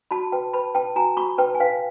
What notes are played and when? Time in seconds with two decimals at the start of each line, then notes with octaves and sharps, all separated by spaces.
0.11 F#4 A5 B5
0.32 B4 G5 A5
0.53 B4 A5 B5
0.74 B4 G5 A5
0.96 F#4 G#5 A#5
1.17 F#4 B5 C#6
1.38 B4 G5 A5
1.55 G#5
1.60 B4 F5 G5